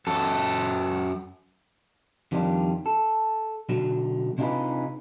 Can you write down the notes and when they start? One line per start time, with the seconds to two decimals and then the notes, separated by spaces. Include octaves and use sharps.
0.07 F#2 A4
2.32 F2 D#3 G3 D4 F4
2.86 A4
3.69 B2 D3 F#3
4.38 C3 D4 D#4 F4 G#4 B4